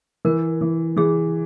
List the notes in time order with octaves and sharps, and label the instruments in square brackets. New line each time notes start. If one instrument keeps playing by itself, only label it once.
[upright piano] E3 [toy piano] A#4
[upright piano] E3
[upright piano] E3 [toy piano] G#4